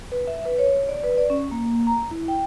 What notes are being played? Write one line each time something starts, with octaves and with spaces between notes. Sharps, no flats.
B4
E5
B4
C#5
D5
B4
D5
C#4
A#3
A#5
E4
G5